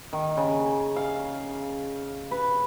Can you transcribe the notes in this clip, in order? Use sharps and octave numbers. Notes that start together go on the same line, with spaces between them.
D#3
C#3
F5
B4